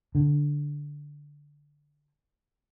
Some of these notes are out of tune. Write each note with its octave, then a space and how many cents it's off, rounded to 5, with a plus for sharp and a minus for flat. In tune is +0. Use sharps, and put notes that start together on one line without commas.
D3 -5